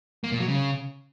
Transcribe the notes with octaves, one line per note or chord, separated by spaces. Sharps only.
A#3
A#2
F#3
C#3